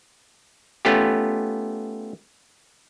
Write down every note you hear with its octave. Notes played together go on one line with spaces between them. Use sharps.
A3 B3 C#4 F4 G4